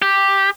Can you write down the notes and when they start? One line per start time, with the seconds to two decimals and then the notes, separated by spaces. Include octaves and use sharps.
0.02 G4